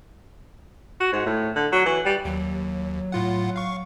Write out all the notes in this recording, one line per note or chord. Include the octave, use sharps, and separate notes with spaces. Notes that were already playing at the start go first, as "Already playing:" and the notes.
F#4
G#2
A2
D3
F#3
E3
G3
D#2 F#3
A2 F4 F#5
F5 C#6